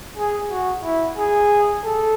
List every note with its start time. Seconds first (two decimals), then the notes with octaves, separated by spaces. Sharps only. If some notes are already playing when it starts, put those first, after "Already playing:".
0.17 G#4
0.51 F#4
0.83 E4
1.17 G#4
1.84 A4